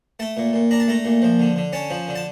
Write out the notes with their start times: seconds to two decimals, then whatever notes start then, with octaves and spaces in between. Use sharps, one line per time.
0.20 A3 A5
0.37 A#2
0.53 A#2
0.71 D4 A#5
0.80 A5
0.88 A3 A#5
1.05 A#2
1.22 F3
1.40 D3
1.56 D3
1.73 C#4 A5
1.90 F3
2.08 D3
2.16 A5